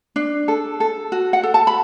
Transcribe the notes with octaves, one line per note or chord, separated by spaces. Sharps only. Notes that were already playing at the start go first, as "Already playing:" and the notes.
D4
A4
A4
F#4
F#5
A4
A5
B5